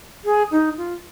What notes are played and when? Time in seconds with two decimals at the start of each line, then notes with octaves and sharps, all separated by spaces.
0.25 G#4
0.51 D#4
0.77 F4